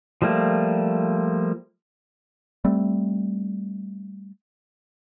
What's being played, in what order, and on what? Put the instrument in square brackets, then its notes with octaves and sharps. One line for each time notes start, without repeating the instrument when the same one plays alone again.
[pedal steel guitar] F3 G3 A3 A#3
[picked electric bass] G3 A3 C4